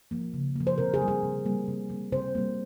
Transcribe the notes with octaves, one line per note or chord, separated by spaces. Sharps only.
F3 A#3
C#3
F3 A#3
C5
C3 A#4
G#4
G3 A#3
G#4
C3
G3 A#3
C3
G3 A#3
C3 C5
G3 A#3